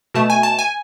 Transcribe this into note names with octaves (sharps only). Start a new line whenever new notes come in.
B2 A3 A5
G#5
A5
G#5